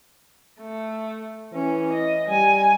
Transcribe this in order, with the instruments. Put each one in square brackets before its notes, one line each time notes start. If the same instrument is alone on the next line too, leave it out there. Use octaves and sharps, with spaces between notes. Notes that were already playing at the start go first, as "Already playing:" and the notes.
[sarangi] A3
[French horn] E3 [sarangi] C#4
[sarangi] D#5
[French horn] G3 [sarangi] G#5